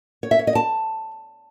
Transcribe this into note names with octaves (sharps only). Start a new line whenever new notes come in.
C#5
E5
C#5
D#5
A5